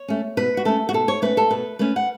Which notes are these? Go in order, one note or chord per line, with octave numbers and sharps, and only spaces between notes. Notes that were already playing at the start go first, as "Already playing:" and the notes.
Already playing: C#5
A3 C#4
B2 B4
F#4
A3 C#4 A4
F#4
B2 A4
C#5
A3 C#4 B4
A4
B2 B4
A3 C#4 B4
F#5